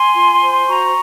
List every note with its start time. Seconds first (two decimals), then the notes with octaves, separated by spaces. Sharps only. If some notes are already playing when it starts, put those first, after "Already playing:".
Already playing: G#5 C6
0.14 F4
0.41 C5
0.68 F#4 A#5 C#6